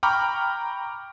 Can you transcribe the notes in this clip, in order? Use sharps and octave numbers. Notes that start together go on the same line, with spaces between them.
G5 A#5 B5 C#6 D6 F6